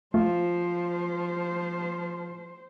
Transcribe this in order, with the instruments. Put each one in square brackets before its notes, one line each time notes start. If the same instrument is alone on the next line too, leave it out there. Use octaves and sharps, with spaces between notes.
[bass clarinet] F3 [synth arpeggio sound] A3 [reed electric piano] F4 [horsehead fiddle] C5